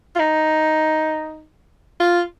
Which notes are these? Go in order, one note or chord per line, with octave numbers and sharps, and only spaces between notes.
F4
D#4
F4